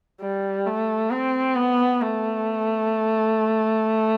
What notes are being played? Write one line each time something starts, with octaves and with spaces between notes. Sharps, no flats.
G3
A3
C4
B3
A3